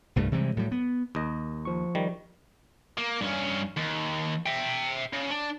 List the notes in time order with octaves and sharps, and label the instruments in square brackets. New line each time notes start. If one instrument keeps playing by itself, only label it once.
[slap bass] C2 G2 A3
C3 E3 G3 G#3
A2 F#3 G3
B3
[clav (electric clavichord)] D#2 D#5
[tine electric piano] F3 C#6
[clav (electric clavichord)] D#3 G3
[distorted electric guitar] A#3
G2 C#4
D#2
E5 G5
C#3
D4